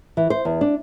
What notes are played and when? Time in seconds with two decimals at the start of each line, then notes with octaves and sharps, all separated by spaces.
0.17 E3
0.30 C5
0.45 E2
0.61 D4